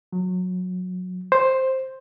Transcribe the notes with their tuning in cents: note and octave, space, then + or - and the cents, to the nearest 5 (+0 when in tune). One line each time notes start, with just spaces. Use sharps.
F#3 -20
C5 +5